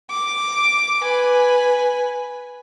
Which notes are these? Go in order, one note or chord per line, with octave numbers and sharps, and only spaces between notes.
D6
B4 G#5